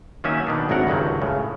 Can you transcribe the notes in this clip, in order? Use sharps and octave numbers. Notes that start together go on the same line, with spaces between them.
D#3 F#3 A#3 C#4 E5 G#5
B2 D#3 D4
G#1 D2 A2 F#3 A#4 F#5
C#2 G2 D#3 F#3
A2 C#3